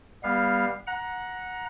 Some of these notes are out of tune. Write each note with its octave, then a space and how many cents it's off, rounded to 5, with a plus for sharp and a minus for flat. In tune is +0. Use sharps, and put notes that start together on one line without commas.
G3 +20 B3 -15 F5 +0
F#5 -10 A#5 +20